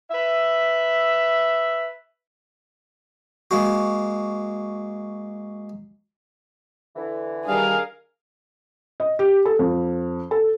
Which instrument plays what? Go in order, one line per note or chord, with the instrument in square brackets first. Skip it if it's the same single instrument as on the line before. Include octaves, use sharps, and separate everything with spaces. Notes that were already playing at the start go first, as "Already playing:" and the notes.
[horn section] B4 E5
[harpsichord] G#3 A#3 F#4
[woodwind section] D3 E3
[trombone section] D#3 G3 D4 [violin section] G#4 A#4 [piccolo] F5
[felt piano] D#5
G4
A4
F2
A4